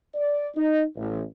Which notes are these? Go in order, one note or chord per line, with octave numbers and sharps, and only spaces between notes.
D5
D#4
A1